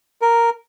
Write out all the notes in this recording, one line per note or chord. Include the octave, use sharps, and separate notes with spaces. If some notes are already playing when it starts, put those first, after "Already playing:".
A#4